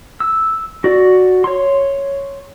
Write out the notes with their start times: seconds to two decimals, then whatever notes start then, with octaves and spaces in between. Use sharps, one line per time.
0.20 E6
0.84 F#4 D5
1.44 C#5 C6